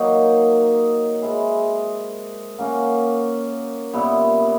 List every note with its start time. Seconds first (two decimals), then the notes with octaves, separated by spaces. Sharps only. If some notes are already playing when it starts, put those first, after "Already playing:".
Already playing: D#3 F#3 A#3 D#4
1.22 G#3 C4 E4 G#4
2.58 A#3 C#4 F#4
3.93 A#2 G3 B3 E4